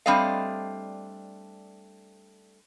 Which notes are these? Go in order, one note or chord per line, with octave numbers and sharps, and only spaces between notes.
G3 A3 C4 D4 D#5 F5